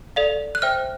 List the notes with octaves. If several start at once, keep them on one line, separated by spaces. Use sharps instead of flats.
A4 D5 F5
F#6
C5 E5 G5 F6